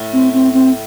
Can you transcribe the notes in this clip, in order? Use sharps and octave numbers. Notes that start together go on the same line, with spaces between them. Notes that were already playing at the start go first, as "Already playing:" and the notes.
Already playing: A2
C4
C4
C4